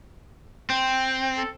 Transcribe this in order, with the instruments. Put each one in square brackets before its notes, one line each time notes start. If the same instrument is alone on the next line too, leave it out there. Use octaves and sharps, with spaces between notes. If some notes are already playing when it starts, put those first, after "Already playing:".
[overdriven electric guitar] C4 [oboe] G5
[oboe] A4